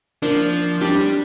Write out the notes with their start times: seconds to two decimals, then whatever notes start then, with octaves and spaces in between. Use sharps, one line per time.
0.22 F3 A#3 D4
0.81 G3 D4 G4